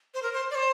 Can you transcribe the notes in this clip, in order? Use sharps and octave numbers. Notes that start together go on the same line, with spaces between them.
C5
A#4
C5
D5
C5